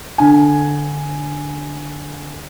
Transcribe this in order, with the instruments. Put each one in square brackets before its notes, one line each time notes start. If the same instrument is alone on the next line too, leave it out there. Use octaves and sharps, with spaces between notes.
[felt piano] D3 G#5